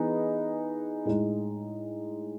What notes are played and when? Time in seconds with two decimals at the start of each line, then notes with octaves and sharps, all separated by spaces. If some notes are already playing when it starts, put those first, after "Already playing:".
Already playing: E3 B3 D#4 G#4 B4
1.05 A2 G#3 D#4